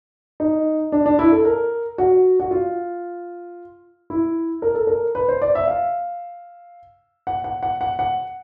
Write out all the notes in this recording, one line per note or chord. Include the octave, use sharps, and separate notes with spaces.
D#4
D4
D4
E4
A4
A#4
F#4
F#4
F4
E4
A#4
A4
A#4
B4
C5
D5
E5
F5
F#5
F#5
F#5
F#5
F#5